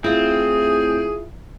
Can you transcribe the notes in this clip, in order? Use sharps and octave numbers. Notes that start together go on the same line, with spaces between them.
A2 C4 E4 F4 G#4